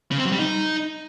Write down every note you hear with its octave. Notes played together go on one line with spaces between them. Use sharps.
C#3
C4
F#3
G3
D#4